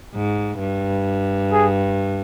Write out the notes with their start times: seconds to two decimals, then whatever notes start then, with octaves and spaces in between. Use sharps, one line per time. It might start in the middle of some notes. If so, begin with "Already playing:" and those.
0.14 G#2
0.60 G2
1.52 G#4